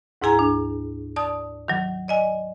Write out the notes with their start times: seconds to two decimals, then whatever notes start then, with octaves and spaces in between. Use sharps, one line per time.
0.22 D2 G#2 E4 G#4 G#5 A#5
0.39 D4
1.16 D5 A5 D#6
1.68 D#3 F#3
2.08 D5 D#5 G#5